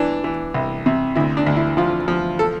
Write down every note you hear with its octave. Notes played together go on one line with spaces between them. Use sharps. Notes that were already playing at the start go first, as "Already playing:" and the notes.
Already playing: E3 D4
E3
C2
C3
D2 E4
D4
D2
E4
F3 F4
F3
A4